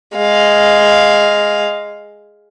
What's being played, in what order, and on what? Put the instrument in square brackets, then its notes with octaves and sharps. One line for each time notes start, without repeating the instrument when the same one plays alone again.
[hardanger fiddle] G#3 F5